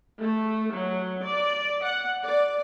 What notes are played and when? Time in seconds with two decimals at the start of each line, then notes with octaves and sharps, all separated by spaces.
0.21 A3
0.73 F#3
1.28 D5
1.84 F#5
2.23 D5